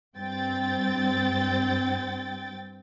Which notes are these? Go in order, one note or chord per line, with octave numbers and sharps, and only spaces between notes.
G2 C4 G5 A6